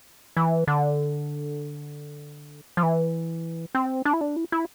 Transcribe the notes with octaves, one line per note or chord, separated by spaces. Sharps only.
E3
D3
F3
E3
C4
D4
E4
D4
E4
E4